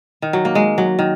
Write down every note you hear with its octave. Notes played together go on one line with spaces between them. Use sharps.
D#3
F#3
A#3
G#3
F#3
D#3